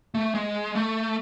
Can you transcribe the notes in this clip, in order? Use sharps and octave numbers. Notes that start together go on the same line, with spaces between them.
A3
G#3
A3